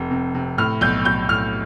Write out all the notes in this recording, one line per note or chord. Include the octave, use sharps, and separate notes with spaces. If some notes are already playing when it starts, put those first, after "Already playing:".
Already playing: F1 C3
C3
C3
A2 F6
B1 G6
B1 G6
A2 F6